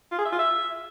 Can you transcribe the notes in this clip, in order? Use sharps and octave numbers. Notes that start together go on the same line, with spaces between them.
F4
G#4
E5
F4
E5